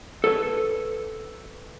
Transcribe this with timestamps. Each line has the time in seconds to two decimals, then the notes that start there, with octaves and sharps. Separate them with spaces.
0.24 A4 B4 C#5